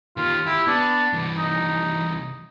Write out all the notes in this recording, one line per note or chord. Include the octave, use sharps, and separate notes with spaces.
D#3 F4 G4
E4 G4
B3 D4
C2 E3
D#4